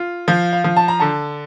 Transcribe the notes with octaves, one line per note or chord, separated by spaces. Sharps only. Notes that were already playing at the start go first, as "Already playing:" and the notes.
Already playing: F4
F3 F5
F5
F3
A5
A#5
D3 A5